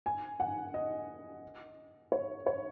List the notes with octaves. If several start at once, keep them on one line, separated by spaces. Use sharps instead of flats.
G#5
F#5
D#5
C#5
C#5